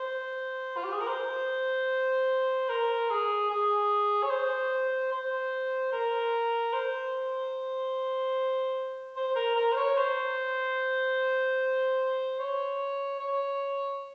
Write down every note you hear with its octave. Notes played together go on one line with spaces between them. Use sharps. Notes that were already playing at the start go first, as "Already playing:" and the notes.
Already playing: C5
F4
G4
G#4
A#4
C5
A#4
G#4
G#4
C#5
C5
C5
A#4
C5
C5
A#4
A#4
C5
C#5
C5
C#5
C#5